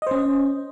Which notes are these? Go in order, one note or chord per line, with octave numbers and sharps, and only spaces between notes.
C#4 C5 D#5